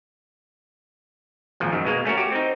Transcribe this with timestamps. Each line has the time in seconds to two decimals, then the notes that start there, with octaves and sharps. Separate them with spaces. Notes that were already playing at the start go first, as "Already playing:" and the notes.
1.60 G#1 A#2 F3
1.72 F#2 D#3
1.85 B2 G#3 A#3
2.05 A3 C#4 F#4 A#4
2.17 F#4 G4
2.32 C4 D#4